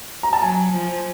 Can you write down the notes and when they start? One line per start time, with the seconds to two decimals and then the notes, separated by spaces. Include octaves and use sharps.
0.23 A#5
0.33 A5
0.41 F#3 G#5
0.73 F3